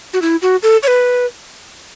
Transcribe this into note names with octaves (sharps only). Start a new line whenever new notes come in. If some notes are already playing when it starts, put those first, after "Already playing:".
F#4
E4
F#4
A4
C#5
B4